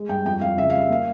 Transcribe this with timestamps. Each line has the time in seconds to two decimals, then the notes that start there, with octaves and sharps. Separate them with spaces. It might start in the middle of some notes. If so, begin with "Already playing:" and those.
Already playing: G#3
0.09 G2 G5
0.25 F2 G5
0.41 F2 F5
0.57 C#3 E5
0.70 G3 F5
0.81 E5
0.89 A#3 F5